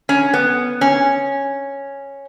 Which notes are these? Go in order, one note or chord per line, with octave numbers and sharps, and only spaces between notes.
C#4
B3
C#4